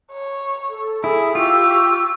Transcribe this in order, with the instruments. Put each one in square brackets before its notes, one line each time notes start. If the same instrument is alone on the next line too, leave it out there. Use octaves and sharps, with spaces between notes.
[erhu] C#5
[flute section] A4
[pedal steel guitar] E4 [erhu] G#4
[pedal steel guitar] F4 [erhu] G4 [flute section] C#6 E6